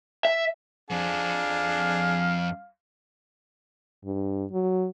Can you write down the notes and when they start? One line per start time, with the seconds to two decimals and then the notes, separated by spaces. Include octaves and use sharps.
0.25 E5
0.90 F2 D4 G#4 F5
4.05 G2
4.52 F#3